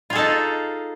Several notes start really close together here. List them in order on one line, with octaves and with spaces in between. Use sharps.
F4 G#4 A4 D#4